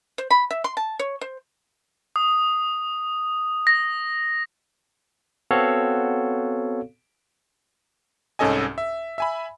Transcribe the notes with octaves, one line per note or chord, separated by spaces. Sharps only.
C5
B5
E5
C6
A5
C#5
C5
D#6
A#6
B3 C4 F#4 A4 C#5 F5
C2 G#2 C#4 A4 D#5 G#5
E5
E5 G#5 B5